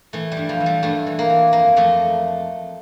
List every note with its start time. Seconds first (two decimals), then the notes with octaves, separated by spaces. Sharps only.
0.13 E3 A3
0.32 G3
0.37 G2
0.49 F3
0.60 E3
0.66 G3
0.83 G2 A3
1.07 E3
1.19 A#3
1.30 E3
1.53 F2 A#3
1.76 F2 A3